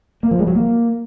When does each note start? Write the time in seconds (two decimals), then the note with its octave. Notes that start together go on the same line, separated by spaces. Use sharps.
0.23 A#3
0.31 F3
0.39 G#3
0.47 F#3
0.55 A#3